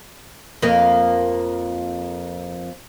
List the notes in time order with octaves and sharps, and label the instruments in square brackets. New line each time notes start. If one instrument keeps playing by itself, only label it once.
[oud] F2 A#3